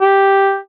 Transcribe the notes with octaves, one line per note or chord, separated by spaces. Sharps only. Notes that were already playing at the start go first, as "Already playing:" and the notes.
G4